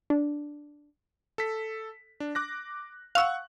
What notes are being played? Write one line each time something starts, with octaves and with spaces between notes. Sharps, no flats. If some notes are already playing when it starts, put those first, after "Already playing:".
D4
A4 B6
D4
D6 F#6 A#6
F5 F#5 C#6 E6 F#6